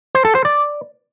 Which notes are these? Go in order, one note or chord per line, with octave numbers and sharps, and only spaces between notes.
C5
A4
C5
D5